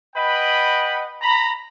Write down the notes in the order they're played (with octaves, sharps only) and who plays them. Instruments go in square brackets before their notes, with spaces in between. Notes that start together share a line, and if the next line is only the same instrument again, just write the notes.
[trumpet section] B4 D#5 F#5 G5 B5
A#5 B5